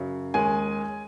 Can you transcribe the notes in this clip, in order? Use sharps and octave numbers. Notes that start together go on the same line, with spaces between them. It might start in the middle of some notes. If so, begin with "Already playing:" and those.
Already playing: F#2 C#3 F#3
D#2 D#3 G#3 C#4 G#5